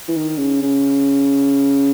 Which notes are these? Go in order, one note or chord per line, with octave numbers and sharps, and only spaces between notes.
E3
D#3
C#3
C#3